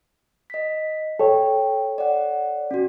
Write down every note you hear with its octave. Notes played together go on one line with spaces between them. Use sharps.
D#5 B6
A4 C#5 G5
D5 F#5
C#4 F#4